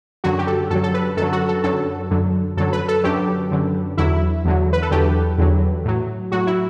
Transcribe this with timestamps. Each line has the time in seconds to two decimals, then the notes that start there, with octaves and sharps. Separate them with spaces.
0.24 F#2 D3 F#3 F#4
0.39 G4
0.47 A4
0.70 F#2 D3 F#3 A4
0.83 A4
0.94 B4
1.17 F#2 D3 F#3 A4
1.32 F#4
1.48 A4
1.64 F#2 D3 F#3 A4
2.11 F#2 D3 F#3
2.57 F#2 D3 F#3 A4
2.73 B4
2.88 A4
3.04 F#2 D3 F#3 G4
3.51 F#2 D3 F#3
3.98 E2 D3 F#3 E4
4.45 E2 D3 F#3
4.73 B4
4.82 A4
4.91 E2 D3 F#3 G4
5.38 E2 D3 F#3
5.85 A2 F#3
6.32 A2 F#3 F#4
6.47 E4